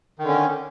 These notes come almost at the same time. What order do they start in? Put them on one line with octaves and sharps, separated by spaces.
D#3 D3 C#4